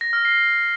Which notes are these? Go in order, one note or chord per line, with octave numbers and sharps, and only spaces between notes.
A#6
F6
C7